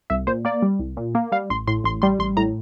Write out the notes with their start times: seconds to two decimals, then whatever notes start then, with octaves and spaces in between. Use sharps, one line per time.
0.10 C2 E5
0.27 A#2 C5
0.45 A#3 D5
0.62 G3
0.79 C2
0.97 A#2
1.15 A#3
1.32 G3 F5
1.50 A1 C6
1.67 A2 C6
1.84 A1 C6
2.02 G3 C6
2.19 A1 C6
2.37 A2 A#5